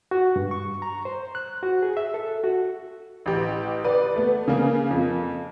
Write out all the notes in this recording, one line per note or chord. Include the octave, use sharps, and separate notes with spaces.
F#4
G2
C#6
A#5
C5
F#6
F#4
G#4
E5
A4
F#4
A1 G4
B4 D5
A3 B3
C#3 A#3
F2